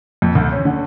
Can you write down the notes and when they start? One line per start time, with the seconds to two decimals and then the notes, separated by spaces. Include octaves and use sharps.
0.22 F2
0.35 D2
0.52 C#4
0.65 D3